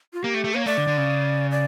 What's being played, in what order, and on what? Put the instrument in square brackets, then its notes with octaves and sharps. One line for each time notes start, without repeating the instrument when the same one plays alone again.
[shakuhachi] F4
[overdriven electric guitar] A#3 [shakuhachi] G4
[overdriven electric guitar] A3
A3
[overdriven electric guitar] A#3 [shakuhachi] C#5
[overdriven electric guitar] A3 [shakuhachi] D5
[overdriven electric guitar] D3
D3
C#3
[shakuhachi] D5